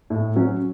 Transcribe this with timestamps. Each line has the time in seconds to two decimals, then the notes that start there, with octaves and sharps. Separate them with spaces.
0.10 A2
0.36 F#3 C#4